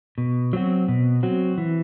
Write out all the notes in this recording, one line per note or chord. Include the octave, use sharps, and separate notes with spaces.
B2
F#3 C4 F#4
B2
F#3 C4 F#4
E3